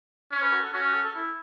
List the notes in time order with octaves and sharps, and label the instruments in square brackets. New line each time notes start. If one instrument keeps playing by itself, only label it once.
[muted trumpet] C#4 [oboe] C#5
[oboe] B4
F#4
A4
[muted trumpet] C#4 [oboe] F#4
[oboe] F#4
A4
A4
E4